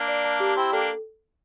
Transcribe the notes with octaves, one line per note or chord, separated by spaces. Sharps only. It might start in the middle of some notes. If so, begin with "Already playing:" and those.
Already playing: A#3 D4
D5
A5
G4
C4 E4 G5
A#3 D4 A4